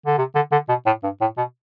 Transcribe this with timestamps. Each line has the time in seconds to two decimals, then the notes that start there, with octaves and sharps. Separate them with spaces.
0.06 D3
0.18 C3
0.35 D3
0.52 D3
0.69 B2
0.86 A2
1.03 G2
1.21 A2
1.38 B2